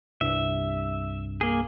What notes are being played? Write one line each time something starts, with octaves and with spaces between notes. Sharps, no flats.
C2 G2 E5
A#3 G#4